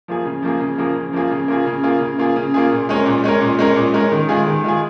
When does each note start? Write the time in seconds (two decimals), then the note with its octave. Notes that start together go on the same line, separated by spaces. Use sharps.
0.08 F3 A#3 F4 G#4
0.25 C#3
0.43 F3 A#3 F4 G#4
0.60 C#3
0.78 F3 A#3 F4 G#4
0.96 C#3
1.13 F3 A#3 F4 G#4
1.31 C#3
1.48 A#3 F4 G#4
1.66 C#3
1.83 A#3 F4 G#4
2.00 C#3
2.19 A#3 F4 G#4
2.36 C#3
2.54 A#3 F4 G#4
2.71 A#2
2.89 G#3 C#4 A#4
3.06 A#2
3.24 G#3 C#4 A#4
3.41 A#2
3.59 G#3 C#4 A#4
3.76 A#2
3.94 G#3 C#4 A#4
4.12 D#3
4.29 G#3 F4 G#4
4.47 D#3
4.64 G#3 F4 G#4